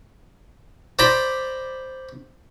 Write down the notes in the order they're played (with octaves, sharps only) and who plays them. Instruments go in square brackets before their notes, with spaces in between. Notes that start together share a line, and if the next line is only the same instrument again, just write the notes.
[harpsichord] C5 D5 A#5 B5